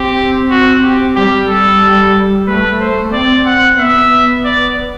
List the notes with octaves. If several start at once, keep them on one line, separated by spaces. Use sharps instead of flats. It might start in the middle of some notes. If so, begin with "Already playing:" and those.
Already playing: C4 G4
F#4
G4
G3 G4
A4
A3 B4
C5
C4 D5
F#5
B3 E5
D5